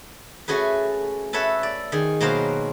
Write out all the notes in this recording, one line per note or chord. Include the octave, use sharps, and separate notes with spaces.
A3 C#4 F#4 G#4 B4
A4 B4 C#5 E5 F#5
D5
D#3 G#4
B2 F#3 A#3 C5 F5